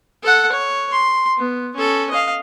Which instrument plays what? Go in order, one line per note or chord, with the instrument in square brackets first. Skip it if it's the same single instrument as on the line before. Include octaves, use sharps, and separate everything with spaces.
[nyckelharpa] A4 F#5
C#5
C6
B3
C#4 A4
D#5 F5